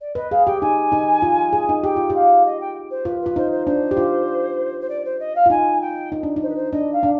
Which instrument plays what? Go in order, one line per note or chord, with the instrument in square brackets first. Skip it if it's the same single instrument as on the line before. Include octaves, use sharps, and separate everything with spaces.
[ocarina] D5
[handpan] B4 [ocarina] D#5
[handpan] G#4 [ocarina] F5
[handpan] G4 [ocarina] G5
[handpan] D#4 [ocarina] G#5
[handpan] D#4
F4
G#4
D#4
[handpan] G4 [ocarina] G5
[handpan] F4
[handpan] G4 [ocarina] F5
[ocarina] D#5
G5
C5
[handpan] F4 [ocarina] B4
[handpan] F4 [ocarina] B4
[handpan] D#4 [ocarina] C5
[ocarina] C5
[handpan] D4 [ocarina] C5
[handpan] G4
F4
[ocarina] C5
D5
C5
D#5
F5
[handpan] F4
[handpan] D#4 [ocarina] G#5
[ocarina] G5
[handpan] D#4
D4
D#4
[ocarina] C5
B4
C5
[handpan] D4 [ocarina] D#5
[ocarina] F5
[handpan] D4